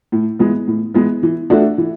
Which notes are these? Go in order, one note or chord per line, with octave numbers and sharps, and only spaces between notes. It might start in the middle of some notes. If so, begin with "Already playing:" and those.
A2
E3 G#3 B3
A2
E3 G#3 B3
E3
A3 D4 F#4 A4
E3